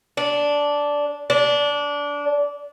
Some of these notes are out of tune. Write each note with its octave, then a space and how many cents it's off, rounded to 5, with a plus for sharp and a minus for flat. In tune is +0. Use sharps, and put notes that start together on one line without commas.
D4 -10
D4 -20